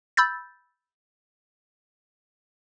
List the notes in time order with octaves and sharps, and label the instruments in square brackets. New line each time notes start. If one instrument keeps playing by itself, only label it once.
[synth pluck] B5 E6 G6 A6